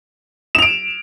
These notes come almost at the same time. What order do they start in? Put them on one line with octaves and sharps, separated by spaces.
E7 F7 D7